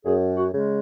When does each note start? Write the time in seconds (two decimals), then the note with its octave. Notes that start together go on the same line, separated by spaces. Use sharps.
0.05 F#2 G#4
0.36 F#4
0.52 C#3 G#3